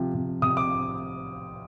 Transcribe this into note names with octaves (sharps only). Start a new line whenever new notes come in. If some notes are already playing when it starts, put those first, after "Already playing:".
Already playing: C3 F3
C3
C3 D#6
D6